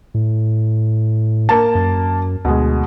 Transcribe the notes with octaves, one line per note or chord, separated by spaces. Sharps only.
A2
A#3 A5
F#2
D2 B2 G#3